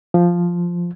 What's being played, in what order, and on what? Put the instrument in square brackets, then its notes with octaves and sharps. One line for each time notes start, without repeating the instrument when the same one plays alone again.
[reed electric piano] F3